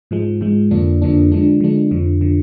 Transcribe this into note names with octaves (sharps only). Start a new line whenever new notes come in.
G#2 F3 G#3
G#2 F3 G#3
F2 D3 F3 A#3 D4
F2 D3 F3 A#3 D4
D3 F3 G#3 D4
D3 F3 G#3 D4
F2 D3 F3
D3 F3